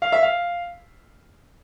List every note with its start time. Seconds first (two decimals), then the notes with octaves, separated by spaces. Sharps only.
0.02 F5
0.12 E5
0.23 F5